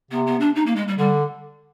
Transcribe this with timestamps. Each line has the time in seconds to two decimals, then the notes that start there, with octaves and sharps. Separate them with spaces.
0.11 C3 B3
0.27 B3
0.40 D4
0.56 D#4
0.66 A#3
0.76 G#3
0.88 G3
0.98 D3 G3